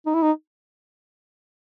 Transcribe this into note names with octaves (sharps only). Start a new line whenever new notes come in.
D#4
E4
D#4